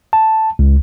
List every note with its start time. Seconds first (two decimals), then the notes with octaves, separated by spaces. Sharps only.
0.13 A5
0.59 C#2